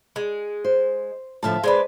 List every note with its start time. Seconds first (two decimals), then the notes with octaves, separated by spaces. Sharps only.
0.16 G#3
0.64 C5
1.43 A2 D3 F3 E5 F5 A5
1.64 G#3 D4 B4 C5